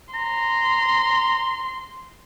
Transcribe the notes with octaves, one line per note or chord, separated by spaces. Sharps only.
A#5 C6